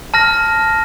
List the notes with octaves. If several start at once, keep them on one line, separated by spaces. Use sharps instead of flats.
A5 F6 A#6